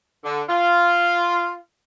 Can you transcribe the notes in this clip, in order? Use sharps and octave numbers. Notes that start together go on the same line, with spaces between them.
D3
F4